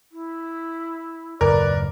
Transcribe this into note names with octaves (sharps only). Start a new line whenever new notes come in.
E4
F#1 D#2 A2 A#4 B4 D5